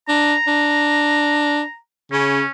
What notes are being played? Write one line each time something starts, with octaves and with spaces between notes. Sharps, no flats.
D4 A#5
D4
C#3 C#4